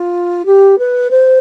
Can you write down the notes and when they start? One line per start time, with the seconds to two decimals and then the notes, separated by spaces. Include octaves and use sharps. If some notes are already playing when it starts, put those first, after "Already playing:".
Already playing: F4
0.46 G4
0.79 B4
1.11 C5